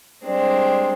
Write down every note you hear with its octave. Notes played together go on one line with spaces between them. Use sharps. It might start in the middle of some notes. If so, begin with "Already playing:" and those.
G3 G#3 C4 D4